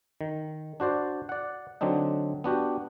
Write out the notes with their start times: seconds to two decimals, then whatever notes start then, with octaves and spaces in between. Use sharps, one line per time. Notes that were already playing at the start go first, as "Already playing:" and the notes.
0.21 D#3
0.80 D4 F#4 C5 D5
1.29 D5 F#5
1.81 D3 F#3 C4 D4 D#4
2.44 B3 D4 F#4 G4